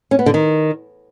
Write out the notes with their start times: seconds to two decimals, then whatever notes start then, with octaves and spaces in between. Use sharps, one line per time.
0.11 C#4
0.19 B3
0.26 D3
0.34 D#3